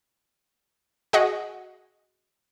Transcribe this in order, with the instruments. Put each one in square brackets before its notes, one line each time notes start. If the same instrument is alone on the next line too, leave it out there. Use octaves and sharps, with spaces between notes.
[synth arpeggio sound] F#4 G#4 D#5 F#5